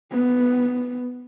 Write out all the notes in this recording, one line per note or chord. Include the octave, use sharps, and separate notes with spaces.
B3